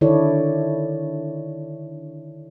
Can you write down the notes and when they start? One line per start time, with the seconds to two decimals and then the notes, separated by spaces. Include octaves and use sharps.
0.01 D3 D#3 E4 A4 C#5 D5